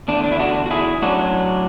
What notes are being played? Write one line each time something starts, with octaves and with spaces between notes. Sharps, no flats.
E2 D3 A3 D4
D4
E4
D4 F#4
F#4
E4 G#4
A2 F#3 C#4 D4 F#4